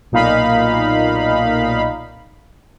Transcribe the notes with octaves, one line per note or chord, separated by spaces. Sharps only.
B1 A#2 D#4 F5 B5